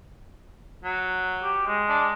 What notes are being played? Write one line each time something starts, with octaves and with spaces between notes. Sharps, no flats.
F#3
G4
G#3
D4